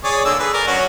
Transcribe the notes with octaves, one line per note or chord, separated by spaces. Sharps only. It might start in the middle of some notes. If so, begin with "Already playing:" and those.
G#4 C#5 D5
D3 A#3 E6
G#4 B4
A#4 D5
F#3 C#4 F#4